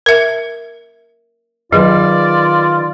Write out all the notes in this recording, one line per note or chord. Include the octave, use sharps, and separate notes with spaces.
A#4 E5
D#3 F#3 F4 G#4 B4 D5